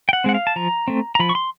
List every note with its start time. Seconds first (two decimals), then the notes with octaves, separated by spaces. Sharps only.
0.09 G5
0.13 F#5
0.24 G#3 C4 F#5
0.34 F5
0.47 A5
0.56 F3 A#5
0.88 A3 C4
1.15 A#5
1.19 F3 B5
1.29 C#6
1.35 C6